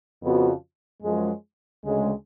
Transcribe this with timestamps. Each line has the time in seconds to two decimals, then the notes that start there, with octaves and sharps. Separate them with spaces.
0.23 F2 C#3 F3 B3 F#4
1.03 F#2 F3 G#3
1.83 D2 C#3 G#3